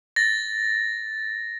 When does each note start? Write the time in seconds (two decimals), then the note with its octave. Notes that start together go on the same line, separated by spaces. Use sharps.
0.16 A6 A#6